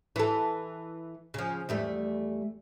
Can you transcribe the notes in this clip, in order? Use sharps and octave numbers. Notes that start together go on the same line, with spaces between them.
E3 A4
C#3 F3
E2 G3 A3